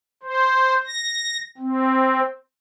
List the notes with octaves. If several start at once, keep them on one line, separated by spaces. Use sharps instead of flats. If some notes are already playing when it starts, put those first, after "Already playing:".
C5
A#6
C4